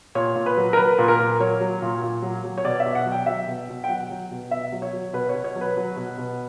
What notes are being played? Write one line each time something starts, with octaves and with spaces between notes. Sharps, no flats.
A#2 C#5
A#2
B4
F#3
A#4
F#3 B4
A#2
A#4
A#2
F#3 C#5
F#3
A#2
A#2
F#3
F#3
C#5
B2 D5
E5
B2
F#5
F#3
G5
F#3 E5
B2
B2
G5
F#3 F#5
F#3
B2
B2 E5
F#3
C#5
F#3
B2 B4
C#5
B2
C#5
F#3
B4
F#3
B2
B2